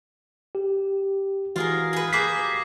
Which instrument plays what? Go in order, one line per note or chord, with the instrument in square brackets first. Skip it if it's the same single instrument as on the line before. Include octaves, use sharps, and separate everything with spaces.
[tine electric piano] G4
[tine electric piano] E3 F#4 [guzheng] F4 G#4 A#4
[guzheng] G#4 B4
[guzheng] A#3 G4 G#4 [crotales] D6 C7 [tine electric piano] B6